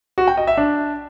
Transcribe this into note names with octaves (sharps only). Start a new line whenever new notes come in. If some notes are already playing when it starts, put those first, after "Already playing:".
F#4
G5
D#5
E5
D4